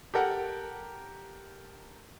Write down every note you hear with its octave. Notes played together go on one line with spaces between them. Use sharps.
G4 A4 A#4 F#5